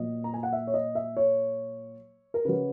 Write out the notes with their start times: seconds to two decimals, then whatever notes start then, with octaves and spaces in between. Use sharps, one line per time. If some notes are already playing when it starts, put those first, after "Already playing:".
Already playing: A#2 F#3 D#5
0.24 A#5
0.34 G#5
0.43 F#5
0.53 E5
0.67 C#5
0.74 D#5
0.95 E5
1.17 C#5
2.34 A#4
2.45 C#3 F#3 B4